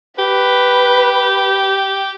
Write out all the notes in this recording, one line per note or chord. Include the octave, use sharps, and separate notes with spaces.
G4 B4